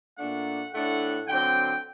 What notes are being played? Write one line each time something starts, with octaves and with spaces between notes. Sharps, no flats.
A#2 A3 D4 F#5
A2 A3 D4 F#5
D3 F#3 C4 G5